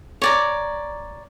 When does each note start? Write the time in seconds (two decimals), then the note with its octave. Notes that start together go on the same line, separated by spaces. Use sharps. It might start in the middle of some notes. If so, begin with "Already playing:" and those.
0.22 C#5 D5 A#5